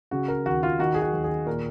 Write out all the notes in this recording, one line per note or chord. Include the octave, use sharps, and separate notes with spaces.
C#3 F#4
A#4
D#2 F#4
F4
D#3 F#4
G#4
F#4
D#2
G#4
A#2 A#4